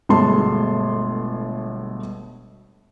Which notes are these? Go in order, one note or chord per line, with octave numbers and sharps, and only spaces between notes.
G1 B2 G#3 A3 A5 C6